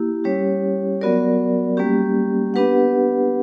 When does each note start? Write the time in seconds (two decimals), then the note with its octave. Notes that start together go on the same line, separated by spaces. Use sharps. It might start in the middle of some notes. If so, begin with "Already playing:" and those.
Already playing: A#3 E4 G4
0.24 G3 C#4 G4 C#5
1.01 F#3 B3 F#4 A#4 D5
1.77 G3 A#3 C#4 G4
2.54 B3 D4 G4 B4 F#5